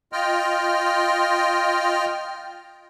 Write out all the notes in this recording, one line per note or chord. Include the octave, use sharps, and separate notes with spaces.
F4 D#5 G5 F6